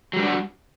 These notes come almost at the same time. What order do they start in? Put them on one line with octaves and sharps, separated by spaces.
F#3 G3 D4 F#4